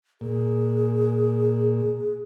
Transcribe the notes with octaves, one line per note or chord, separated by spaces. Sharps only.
A#2 G#4